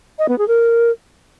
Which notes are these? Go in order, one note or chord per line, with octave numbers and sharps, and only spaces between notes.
D#5
B3
G#4
A#4